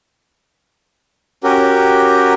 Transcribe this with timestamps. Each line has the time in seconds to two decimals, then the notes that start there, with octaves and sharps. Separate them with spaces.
1.44 C#4 F#4 G4 A#4